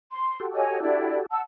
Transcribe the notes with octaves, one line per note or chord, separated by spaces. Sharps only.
C6
F#4 G4 A4
C#5 D#5 G#5
D4 E4 D5
F#5 A5 E6